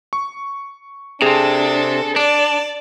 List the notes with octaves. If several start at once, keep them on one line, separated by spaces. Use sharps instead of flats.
C#6
C3 C4 D4 G#4 A4
D4 D5